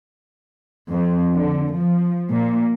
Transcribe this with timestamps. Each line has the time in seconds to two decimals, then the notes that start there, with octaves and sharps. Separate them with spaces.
0.91 F2
1.37 D3
1.76 F3
2.32 A#2